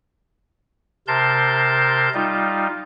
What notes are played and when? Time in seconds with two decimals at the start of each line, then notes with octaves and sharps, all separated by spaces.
1.08 C3 A#4 A5 C6 G6
2.14 G3 D#4 F4